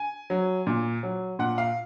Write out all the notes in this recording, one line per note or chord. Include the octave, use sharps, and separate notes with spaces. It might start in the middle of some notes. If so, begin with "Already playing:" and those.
Already playing: G#5
F#3
A#2
F#3
A#2 F#5
F5